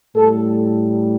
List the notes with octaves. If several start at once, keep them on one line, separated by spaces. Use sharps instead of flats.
A2 G3 A4